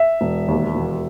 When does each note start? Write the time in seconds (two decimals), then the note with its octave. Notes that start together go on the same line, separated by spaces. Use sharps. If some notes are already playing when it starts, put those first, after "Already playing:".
Already playing: E5
0.21 E1
0.48 D#2
0.75 E1